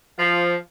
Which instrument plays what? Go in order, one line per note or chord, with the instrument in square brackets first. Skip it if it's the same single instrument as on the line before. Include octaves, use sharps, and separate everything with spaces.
[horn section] F3